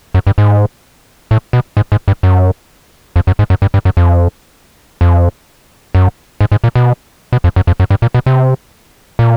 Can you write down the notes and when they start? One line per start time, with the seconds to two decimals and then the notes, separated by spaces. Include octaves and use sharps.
0.14 F#2
0.27 G2
0.38 G#2
1.31 A2
1.53 B2
1.77 G#2
1.92 G#2
2.08 G2
2.23 F#2
3.16 F2
3.27 F#2
3.39 G#2
3.50 F#2
3.62 G2
3.74 G2
3.85 F#2
3.97 F2
5.01 F2
5.95 F#2
6.41 G#2
6.52 G#2
6.64 A#2
6.75 B2
7.33 B2
7.44 F2
7.56 F#2
7.67 F2
7.80 F#2
7.90 G2
8.02 A#2
8.15 B2
8.26 C3
9.19 A#2